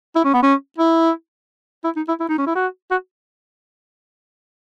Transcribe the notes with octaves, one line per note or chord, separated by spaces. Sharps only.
E4
C#4
B3
C#4
E4
E4
D#4
E4
E4
D#4
C#4
E4
F#4
F#4